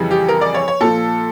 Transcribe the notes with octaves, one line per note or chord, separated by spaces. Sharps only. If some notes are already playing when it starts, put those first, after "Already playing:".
Already playing: F2 C#3 E3 G3
G4
A#4
D5
C#5
C#5
A#2 F3 A4